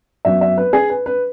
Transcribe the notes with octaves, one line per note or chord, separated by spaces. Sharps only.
F#2 F#3 B3 E5
E5
B4
G#4
B4
B4